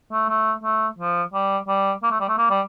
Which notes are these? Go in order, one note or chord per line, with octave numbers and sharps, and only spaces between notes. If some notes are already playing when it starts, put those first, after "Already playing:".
A3
A3
A3
F3
G3
G3
A#3
A3
G3
A3
A#3
G3